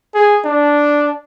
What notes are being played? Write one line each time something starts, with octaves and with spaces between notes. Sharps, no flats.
G#4
D4